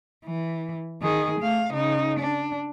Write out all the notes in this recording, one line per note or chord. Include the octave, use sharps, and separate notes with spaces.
E3
D#3 G#4
A3 F5
C#3 D#4
D4